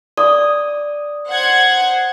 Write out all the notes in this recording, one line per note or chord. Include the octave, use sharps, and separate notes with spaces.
D5 D#6
C5 F#5 G#6